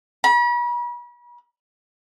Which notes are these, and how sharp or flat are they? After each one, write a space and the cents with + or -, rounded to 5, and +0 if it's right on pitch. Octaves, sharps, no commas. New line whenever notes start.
B5 -40